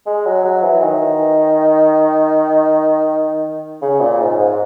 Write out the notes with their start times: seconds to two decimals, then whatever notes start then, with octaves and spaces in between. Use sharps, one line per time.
0.06 G#3
0.26 F#3
0.44 F#3
0.63 E3
0.82 D#3
3.82 C#3
4.00 A#2
4.20 G#2
4.39 G#2